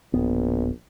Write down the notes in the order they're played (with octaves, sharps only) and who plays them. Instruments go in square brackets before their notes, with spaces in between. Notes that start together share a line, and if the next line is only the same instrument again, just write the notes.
[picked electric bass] D1 B3 [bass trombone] A#1